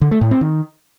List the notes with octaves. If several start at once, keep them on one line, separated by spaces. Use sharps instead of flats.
D3
A3
A2
C4
D#3